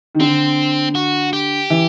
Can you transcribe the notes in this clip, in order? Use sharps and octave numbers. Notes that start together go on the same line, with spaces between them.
D#3
D3 C4
F#4
G4
E3